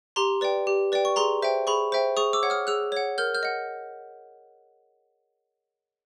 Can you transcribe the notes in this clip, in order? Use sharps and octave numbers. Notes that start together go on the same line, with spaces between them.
G4 A#5 C6
B4 D5 G5
G4
B4 D5 G5
C#6
G#4 A#5 C6
C5 E5 G5
G#4 B5 C#6
C5 E5 G5
G#4 C#6 D#6
D6 E6
C#5 F#5
D#6 F6
G#4 E6 F#6
C#5 F#5
A#4 F6 G6
F6 G6
D#5 F#5